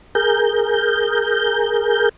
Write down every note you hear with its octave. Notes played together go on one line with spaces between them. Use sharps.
G#4 A#4 G6